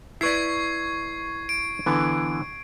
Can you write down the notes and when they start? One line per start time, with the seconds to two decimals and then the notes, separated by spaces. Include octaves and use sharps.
0.21 E4 B4 D5 C#6 G#6 C7
1.49 D7
1.86 D3 E3 B3